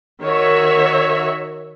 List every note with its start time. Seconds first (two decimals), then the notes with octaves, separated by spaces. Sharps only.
0.22 D#3 F#4 C#5 E5